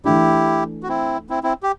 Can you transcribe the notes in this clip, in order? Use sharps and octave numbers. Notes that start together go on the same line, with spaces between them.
E3 A3 D4 E4 G4
F#4
C4 E4
C4 E4
C4 E4
G4